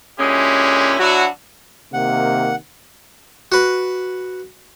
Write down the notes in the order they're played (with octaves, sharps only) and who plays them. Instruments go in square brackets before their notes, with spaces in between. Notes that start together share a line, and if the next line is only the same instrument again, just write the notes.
[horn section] A#2 D3 G#3 C#4 E4 G4
F#3 D4 E4 F#4
[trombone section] C3 D#3 A#3 [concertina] F#5
[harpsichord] F#4 B4